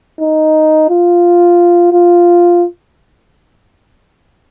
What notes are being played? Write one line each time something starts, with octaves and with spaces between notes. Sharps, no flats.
D#4
F4
F4